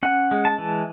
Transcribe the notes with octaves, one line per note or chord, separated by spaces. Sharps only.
C#4 F#5
G#3
A5
E3